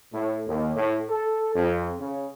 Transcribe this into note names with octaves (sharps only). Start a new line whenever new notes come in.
A2
D#2
A2
A4
F2
C#3